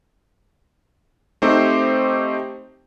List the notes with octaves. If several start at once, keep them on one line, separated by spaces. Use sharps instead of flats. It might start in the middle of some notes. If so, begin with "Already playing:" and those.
A3 C4 D#4 G4 C5